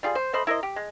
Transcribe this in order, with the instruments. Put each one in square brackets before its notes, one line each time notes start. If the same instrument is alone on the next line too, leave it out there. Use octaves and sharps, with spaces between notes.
[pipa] G3 F4 G#4
C5
A3 C5 D#5 B5
E4 A#4 C5 D#5
G4
G#3